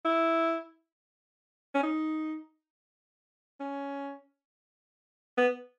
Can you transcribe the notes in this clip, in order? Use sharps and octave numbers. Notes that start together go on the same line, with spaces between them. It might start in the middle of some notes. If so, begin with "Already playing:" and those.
E4
C#4
D#4
C#4
B3